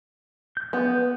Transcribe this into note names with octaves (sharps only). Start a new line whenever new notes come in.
G6
B3